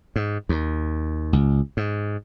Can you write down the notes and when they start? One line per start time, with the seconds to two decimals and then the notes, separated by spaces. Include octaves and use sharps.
0.16 G#2
0.49 D#2
1.33 C#2
1.77 G#2